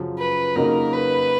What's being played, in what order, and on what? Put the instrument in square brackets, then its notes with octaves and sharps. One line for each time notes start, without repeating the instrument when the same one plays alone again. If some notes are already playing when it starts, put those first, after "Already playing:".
Already playing: [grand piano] F#2 C#3 F3
[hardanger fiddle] B4
[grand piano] F2 C#3 F#3 A#3 D#4 [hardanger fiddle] A#4
[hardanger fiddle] B4